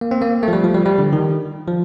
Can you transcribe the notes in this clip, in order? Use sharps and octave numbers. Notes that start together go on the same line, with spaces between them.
A#3
C4
A#3
A3
F3
G3
F3
G3
G3
D3
D#3
F3